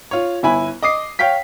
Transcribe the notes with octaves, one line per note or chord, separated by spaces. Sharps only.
F4 C#5
G1 E4 G#5 B5
D#5 D6 D#6 C7
C#5 F5 G5 B6